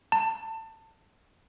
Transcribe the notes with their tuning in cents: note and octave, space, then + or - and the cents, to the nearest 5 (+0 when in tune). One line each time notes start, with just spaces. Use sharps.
A5 +25